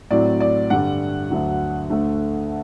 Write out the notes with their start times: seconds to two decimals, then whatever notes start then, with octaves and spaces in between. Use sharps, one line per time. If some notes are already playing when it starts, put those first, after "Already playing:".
0.11 A2 F#3 C4 D5
0.40 D5
0.70 G2 D3 G3 F#5
1.30 D2 D3 F#3
1.90 D2 D3 A3